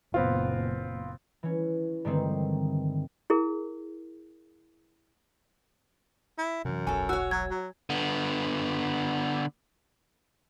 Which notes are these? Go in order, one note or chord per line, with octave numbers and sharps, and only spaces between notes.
F#1 A#2 B3 C4 F4
E3 C#4
G2 D3 D#3 G#3 A3 C4
E4 G#4 A#4
E4
F#2 C3 E3
E1 B1 A4 C#5 G#5
F#4 C#5 E6
F#3 G#6
F#3
D3 B3